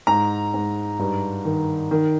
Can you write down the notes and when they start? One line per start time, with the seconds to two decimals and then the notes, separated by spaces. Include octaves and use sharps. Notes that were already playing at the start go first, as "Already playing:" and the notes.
0.07 G#2 A#5
0.54 G#2
0.99 G2
1.45 D#3
1.91 D#3